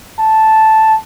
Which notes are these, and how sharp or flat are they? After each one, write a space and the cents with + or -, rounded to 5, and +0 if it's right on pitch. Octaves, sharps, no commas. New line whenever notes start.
A5 -5